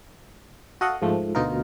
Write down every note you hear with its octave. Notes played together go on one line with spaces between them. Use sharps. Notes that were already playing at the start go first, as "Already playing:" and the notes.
F#4 A4 D#5 F5 F#5
G#2 F3 A3
D2 B2 D#4 F4 A#4